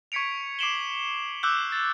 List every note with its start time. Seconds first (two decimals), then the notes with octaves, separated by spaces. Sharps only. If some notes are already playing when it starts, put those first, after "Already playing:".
0.12 C#6 G#6 B6 C#7 D7 F7
0.59 D6 C7 D7 E7 F#7 G7
1.43 D6 E6 F#6 G6
1.72 A6